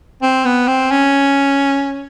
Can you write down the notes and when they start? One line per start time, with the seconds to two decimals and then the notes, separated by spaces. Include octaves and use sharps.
0.22 C4
0.45 B3
0.68 C4
0.91 C#4